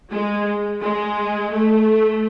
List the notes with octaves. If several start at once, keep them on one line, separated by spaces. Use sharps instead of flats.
G#3
G#3
A3